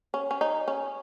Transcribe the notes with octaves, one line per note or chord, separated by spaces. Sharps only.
C#4
C#4
D#4
C#4